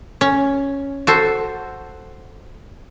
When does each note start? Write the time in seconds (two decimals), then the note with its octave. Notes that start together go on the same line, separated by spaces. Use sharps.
0.21 C#4
1.07 F#4 A4 C5